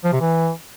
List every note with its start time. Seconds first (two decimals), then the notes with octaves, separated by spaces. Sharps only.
0.04 F3
0.13 C3
0.21 E3